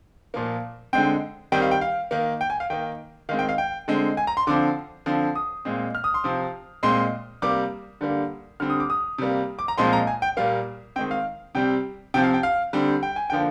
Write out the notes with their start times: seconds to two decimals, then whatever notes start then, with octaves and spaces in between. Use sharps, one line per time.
0.34 A#2 F3 A#3
0.93 D3 G#3 C4 G5
1.52 D#3 G3 C4 G5
1.62 F5
1.71 G5
1.81 F5
2.11 D#3 A#3
2.41 G5
2.50 G#5
2.60 F5
2.70 D#3 A#3 G5
3.29 D#3 G#3 C4 F5
3.39 G5
3.49 F5
3.58 G5
3.88 D3 G#3 C4
4.17 G#5
4.27 A#5
4.37 C6
4.47 D3 F3 C4 D6
5.06 D3 F3 C4
5.35 D#6
5.65 A#2 G#3 C4
5.95 F6
6.04 D#6
6.14 C6
6.24 C3 F3 C4
6.83 A#2 G#3 C4 C6
7.42 C3 G3 A#3 D6
8.01 D3 G3 A#3
8.60 D3 G3 C4 F6
8.70 D#6
8.80 D6
8.90 D#6
9.18 C3 G3 A#3
9.59 D6
9.68 A#5
9.78 A#2 F3 G#3 C4 C6
9.93 A#5
10.07 G#5
10.22 G5
10.37 A#2 G3 A#3 F5
10.96 D#3 G#3 C4 G5
11.11 F5
11.55 C3 G3 C4 G5
12.14 C3 F3 C4 G5
12.24 F5
12.34 G5
12.43 F5
12.73 D3 G3 C4
13.03 G5
13.16 G#5
13.30 D3 F3 A#3 G5